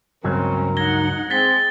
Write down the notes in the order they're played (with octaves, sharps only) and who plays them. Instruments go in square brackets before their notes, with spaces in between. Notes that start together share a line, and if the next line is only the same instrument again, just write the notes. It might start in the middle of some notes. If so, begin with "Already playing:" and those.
[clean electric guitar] C#2 G2 F#3 [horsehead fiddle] C4 C#4 [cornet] A#4
[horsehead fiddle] D#4 F#5 [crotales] G#6 A#6 G7
[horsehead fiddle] G#3 [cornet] C4 [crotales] A6 B6 G7